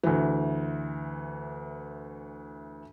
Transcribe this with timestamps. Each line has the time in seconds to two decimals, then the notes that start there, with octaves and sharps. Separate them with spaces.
0.03 D2 E3